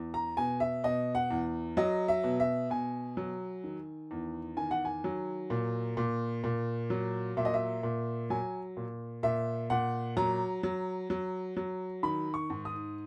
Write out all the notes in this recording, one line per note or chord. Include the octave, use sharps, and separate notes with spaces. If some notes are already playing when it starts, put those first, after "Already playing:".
Already playing: E2
A#5
B2 G#5
E5
B2 D#5
F#5
E2
F#3 D#5
E5
B2
E5
B2 G#5
F#3
D#3
E2
D#3 G#5
F#5
G#5
F#3
A#2
A#2
A#2
F#3
A#2 E5
D#5
E5
A#2
F#3 G#5
A#2
A#2 E5
A#2 F#5
F#3 A#5
F#3
F#3
F#3
D#3 B5
C#6
G#2
D#6